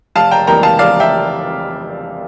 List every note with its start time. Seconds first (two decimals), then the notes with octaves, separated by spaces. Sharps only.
0.15 F1 F5 A5
0.31 G5 A#5
0.47 F2 E3 G3 A#3 G5 A#5
0.63 F5 A5
0.79 F1 D5 F5
1.00 E5 G5